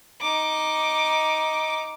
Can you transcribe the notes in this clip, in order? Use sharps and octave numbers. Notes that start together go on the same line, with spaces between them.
D#4 D6